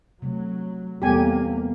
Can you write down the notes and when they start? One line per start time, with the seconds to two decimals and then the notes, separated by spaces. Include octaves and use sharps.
0.22 C3 F#3 A3
1.02 E2 C3 G3 A#3 B3 G4 A4 G#5